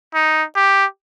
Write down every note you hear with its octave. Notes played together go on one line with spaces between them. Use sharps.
D#4
G4